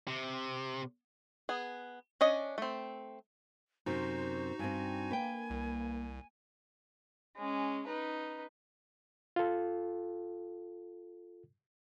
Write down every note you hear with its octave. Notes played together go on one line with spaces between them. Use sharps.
C3
B3 G#4
C#4 D4 D#5
A3 C4
F#2 C3 D#4 F#4 C5
G2 C4 G#5
A#3 B4 G5
C2
G#3 C#4
D#4 B4
F4 A4